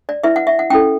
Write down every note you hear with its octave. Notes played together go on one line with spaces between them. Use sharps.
D5
E4 B4 E5
F#5
E5
F#5
C#4 E4 A4 G5